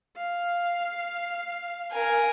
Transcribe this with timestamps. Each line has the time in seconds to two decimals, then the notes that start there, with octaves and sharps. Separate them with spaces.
0.17 F5
1.92 A#4 G#5